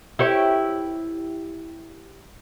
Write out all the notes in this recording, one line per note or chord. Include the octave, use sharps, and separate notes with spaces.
E4 G4 C#5